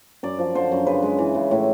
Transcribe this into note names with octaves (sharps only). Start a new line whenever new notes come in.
F#2 D5
F3
D3 C5
F#2
C#3 B4
G#3
E3
C#3
A2